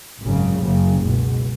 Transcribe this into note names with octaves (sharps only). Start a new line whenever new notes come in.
G#1 F#2 C#3
F#1 F#2 C#3
C#2 B2